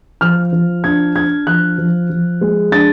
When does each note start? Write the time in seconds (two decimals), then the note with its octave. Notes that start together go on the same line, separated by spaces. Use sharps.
0.21 F3 F6
0.53 F3
0.84 D4 G#6
1.16 D4 G#6
1.47 F3 F#6
1.78 F3
2.10 F3
2.41 G#3
2.72 D4 A6